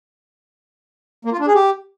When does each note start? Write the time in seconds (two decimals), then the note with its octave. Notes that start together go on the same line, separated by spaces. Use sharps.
1.25 A#3
1.32 F4
1.40 D4
1.47 G#4
1.55 G4